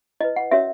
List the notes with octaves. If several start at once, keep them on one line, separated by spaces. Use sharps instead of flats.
E4 B4 D#5
F#5
C#4 F#4 A#4 C#5 E5